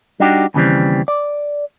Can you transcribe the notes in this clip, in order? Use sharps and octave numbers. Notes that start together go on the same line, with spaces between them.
G3 D4 D#4 F#4 G4
D#2 C#3 E3 G3 C4
D5